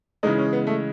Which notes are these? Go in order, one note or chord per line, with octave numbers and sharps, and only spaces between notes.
C#3 E3 G#3 D#4
C#4
B3
A3